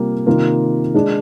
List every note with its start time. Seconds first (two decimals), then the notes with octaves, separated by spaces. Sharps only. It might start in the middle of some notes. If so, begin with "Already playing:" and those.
Already playing: C3 G3 A#3 F4
0.26 C3 D#3 A#3 F4 A#4
0.94 G#3 D4 G#4